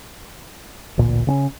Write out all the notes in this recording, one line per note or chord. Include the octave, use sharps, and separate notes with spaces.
A1 D2 A#2
C#3 C4 C#4